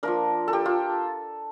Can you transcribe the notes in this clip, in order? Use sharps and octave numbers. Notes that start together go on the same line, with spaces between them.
F3 A#3 D4 A#4
A4
G4
F4